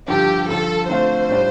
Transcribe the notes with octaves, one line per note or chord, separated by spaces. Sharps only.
G2 D3 F3 G4
G2 D3 F3 A4
D3 A3 C4 F4 C5
A2 G3 D4 F4